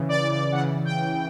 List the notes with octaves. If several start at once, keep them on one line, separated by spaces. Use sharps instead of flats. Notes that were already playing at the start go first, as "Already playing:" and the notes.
Already playing: C#3 E3
D5
D5
C#3 E3 F#5
G5